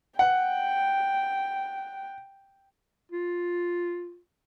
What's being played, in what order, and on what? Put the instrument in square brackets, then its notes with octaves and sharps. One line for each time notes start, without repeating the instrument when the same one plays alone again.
[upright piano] F#5 [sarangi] G5
[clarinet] F4